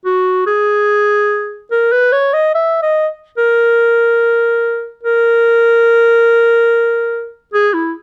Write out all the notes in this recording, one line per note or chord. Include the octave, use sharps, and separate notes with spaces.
F#4
G#4
A#4
B4
C#5
D#5
E5
D#5
A#4
A#4
G#4
E4